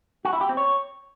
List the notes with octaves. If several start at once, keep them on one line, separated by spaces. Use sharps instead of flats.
F#4
E4
G4
C4
C#5